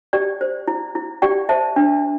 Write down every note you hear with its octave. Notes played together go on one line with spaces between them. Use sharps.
G4 D5 G5
C5
E4
E4
G4 D5 G5
C5 E5 A5
D4